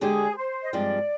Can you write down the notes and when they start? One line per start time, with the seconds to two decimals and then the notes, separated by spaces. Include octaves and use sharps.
0.01 D3 G#3 D4 G4 G#4
0.36 C5
0.62 D#5
0.73 G2 F3 G#3 C4 F4 D5